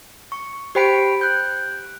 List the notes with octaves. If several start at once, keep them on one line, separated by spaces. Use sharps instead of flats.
C#6
G4 C5 G5 B5 B6 D7
F#6 G6